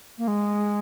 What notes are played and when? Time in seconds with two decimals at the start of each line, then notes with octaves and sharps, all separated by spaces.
0.18 A#3
0.28 G#3